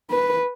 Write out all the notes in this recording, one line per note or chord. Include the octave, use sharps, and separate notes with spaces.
B4